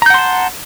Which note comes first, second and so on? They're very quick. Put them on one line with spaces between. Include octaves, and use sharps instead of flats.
A#5 G6 F#5 C6 A5